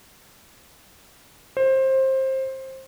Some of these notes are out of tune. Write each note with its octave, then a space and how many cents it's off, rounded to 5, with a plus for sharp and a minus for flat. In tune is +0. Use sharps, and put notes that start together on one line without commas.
C5 +20